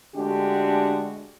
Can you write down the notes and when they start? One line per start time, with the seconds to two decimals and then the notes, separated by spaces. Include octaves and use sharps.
0.16 D3 G#3 A3 D4 F#4 G4